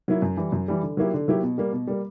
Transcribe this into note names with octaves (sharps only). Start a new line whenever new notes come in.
F#3 A#3 E4
F#2
E3 G3
F#2
E3 G3
D3
F#3 A#3 E4 G4
D3
F#3 A#3 E4 G4
B2
G3 A#3
B2
G3 A#3